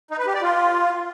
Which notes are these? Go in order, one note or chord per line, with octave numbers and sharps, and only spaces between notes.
D#4
B4
G4
D5
F4